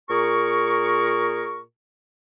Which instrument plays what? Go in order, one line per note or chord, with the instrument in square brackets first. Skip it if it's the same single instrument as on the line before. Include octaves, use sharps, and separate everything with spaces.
[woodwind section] A#2 G#4 A#4 C#6